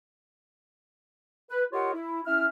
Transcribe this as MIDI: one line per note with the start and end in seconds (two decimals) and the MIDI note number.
1.51 1.64 71
1.73 1.94 65
1.73 1.94 67
1.73 1.94 70
1.73 1.94 73
1.73 1.94 75
1.73 1.94 78
1.94 2.21 64
2.26 2.47 61
2.26 2.47 64
2.26 2.47 76
2.26 2.47 89